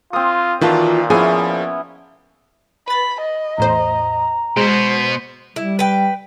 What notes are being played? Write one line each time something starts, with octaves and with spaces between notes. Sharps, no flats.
C4 F4 D#6
A#2 D#3 E3 F4 F#4 B4 A5
F3 B3 C#4 E4 G#4
B4 B5 A6
D#5
E2 A2 C5 A#5
B2 G#3 B3 C5
G3 E4
B4 G5